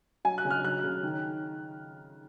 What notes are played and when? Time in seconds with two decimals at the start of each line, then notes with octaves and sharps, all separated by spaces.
0.25 F#3 G#5
0.38 F#6
0.45 C#3
0.51 F6
0.64 F#3 F#6
0.84 C#3
1.03 D#3